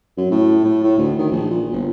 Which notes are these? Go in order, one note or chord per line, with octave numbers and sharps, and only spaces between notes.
F#2
A2
A2
A2
D2
D#3
A#1
A#2
G1